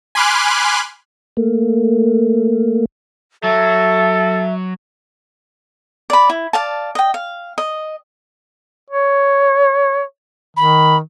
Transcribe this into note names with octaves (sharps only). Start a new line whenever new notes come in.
G#5 B5 C6 D6 F6 F#6
A3 A#3
F#3 A4 E5
D5 B5
E4
D5 F5 A5
D#5 G5
F5
D#5
C#5
D#3 B5